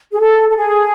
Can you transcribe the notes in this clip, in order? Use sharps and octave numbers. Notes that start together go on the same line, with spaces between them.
G#4
A4
A4
G#4